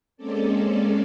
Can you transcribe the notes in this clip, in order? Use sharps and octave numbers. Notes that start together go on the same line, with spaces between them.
G#3 A#3 C4 C#4 A4 D5